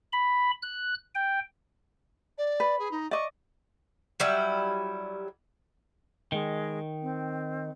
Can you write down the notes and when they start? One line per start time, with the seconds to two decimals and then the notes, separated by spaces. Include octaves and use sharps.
0.13 B5
0.63 F#6
1.15 G5
2.38 D5
2.60 B4
2.79 G#4
2.91 D#4
3.11 D5 D#5 C#6
4.20 F#3 G3 E4
6.32 D#3 G#3
7.02 C4